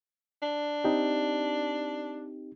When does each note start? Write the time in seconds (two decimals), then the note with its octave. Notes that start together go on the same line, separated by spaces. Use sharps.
0.42 D4
0.84 C4 D#4 G4